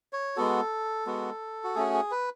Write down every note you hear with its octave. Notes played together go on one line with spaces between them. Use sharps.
C#5
G#3 B3 F#4 A4
G#3 B3 F#4
F#4
A3 C#4 F#4 G#4
G#4
B4